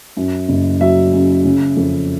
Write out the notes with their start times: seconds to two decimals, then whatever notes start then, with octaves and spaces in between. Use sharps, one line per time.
0.17 F#2
0.49 F#1
0.81 F#3 E5
1.13 C#3
1.45 C#3
1.77 F2